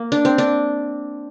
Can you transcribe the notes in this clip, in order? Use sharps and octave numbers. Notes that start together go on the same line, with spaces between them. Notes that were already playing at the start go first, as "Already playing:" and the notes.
Already playing: A#3
D4
C4
D4